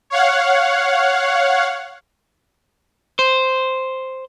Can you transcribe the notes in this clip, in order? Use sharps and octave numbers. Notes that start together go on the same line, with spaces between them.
C#5 F5 F#5
C5